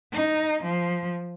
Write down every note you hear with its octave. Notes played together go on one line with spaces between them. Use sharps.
D#4
F3